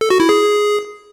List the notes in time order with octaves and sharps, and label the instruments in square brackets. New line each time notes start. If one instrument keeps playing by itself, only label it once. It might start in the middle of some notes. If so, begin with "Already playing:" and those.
[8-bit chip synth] A4
F#4
E4
G#4